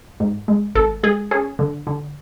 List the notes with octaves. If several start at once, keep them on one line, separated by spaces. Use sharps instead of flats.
G#2
G#3
G#1 A4
G#3 G#4
C#4 G#4
D3
D3